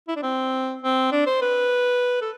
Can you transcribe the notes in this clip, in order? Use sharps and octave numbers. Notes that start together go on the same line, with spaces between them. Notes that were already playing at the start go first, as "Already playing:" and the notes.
E4
D4
C4
C4
D4
C5
B4
A4